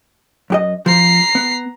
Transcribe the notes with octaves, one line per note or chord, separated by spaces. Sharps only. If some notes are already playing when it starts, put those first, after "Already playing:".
F#2 G4 D#5
F3 A#5 C7
B3